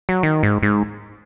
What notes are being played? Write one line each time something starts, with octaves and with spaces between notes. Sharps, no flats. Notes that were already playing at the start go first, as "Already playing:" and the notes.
F#3
D#3
G#2
G#2